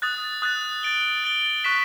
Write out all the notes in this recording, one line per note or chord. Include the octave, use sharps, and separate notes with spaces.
D#6 F#6 A6
D#6 F#6 A6
A6 D7 G7
A6 D7 G7
C#6 F#6 B6 E7